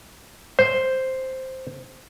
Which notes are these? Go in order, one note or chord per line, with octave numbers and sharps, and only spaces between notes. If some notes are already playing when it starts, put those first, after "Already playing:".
C5